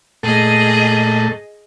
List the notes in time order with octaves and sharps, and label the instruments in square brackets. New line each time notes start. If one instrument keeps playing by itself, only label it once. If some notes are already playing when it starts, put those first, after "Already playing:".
[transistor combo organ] A#2 A3 A4 [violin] G#4 D#5